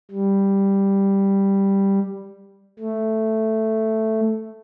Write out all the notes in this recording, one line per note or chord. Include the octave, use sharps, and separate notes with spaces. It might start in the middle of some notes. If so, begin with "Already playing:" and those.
G3
A3